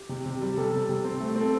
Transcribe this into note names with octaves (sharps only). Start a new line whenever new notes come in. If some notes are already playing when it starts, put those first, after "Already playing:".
Already playing: G4
C3
C3
G3
C3 A4
C3
C3
C4
A3
C4
A4